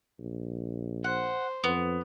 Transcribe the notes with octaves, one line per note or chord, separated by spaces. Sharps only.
A#1
C5 F#5
F2 B3